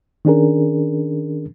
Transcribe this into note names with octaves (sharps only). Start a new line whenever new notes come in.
D#3 C#4 D4 G#4 A#4